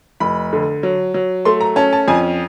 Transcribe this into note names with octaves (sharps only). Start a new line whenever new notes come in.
F1 B5
D3
F#3
F#3
A3 C6
A#5
C#4 A5
A5
F2 G#5